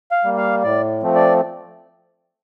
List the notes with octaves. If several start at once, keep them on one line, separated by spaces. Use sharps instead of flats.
F5
G3 A#3
F5
A2 D5
F3 A3 C4
D5